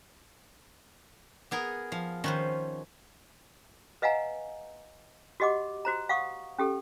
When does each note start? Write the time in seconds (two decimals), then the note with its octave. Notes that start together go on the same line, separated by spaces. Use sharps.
1.51 B3 G#4 A#4
1.92 F3 F5
2.24 D#3 C#4 B4 C5
4.02 B4 D#5 F5 F#5 G#5 A#5
5.40 F#4 G4 D#5 F#5 D6
5.85 F#4 C5 A#5
6.09 F5 F#5 C#6 D#6
6.58 C#4 G4 A4